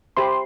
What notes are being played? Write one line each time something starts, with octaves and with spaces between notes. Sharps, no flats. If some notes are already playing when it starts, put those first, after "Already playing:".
G4 C5 E5 B5 C6